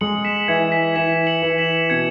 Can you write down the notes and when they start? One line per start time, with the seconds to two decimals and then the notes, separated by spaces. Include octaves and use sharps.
0.01 G#3 C#7 F#7
0.25 B6 E7
0.48 E3 G#6 C#7
0.72 B6
0.96 E3 B6 E7
1.27 C#7 F#7
1.42 E3
1.58 B6 E7
1.90 B2 G#6 C#7